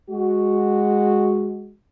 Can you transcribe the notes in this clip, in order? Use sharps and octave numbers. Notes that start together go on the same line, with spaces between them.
G#3 F#4